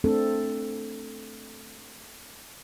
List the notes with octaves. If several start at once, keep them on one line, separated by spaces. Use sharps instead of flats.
A3 C4 D4 A4